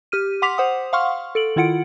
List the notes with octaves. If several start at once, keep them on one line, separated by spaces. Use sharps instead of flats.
G4 F6 D#7
F#5 C6 D6 B6 F7
C5 F#5 D#6
F5 F#5 C6 C#6 F6
A4 D7 F#7
D#3 E4 F4 F#5 C#7 D7